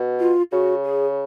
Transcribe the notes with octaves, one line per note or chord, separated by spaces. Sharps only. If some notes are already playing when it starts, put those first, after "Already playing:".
Already playing: B2
F4
C#3 F#4
G#4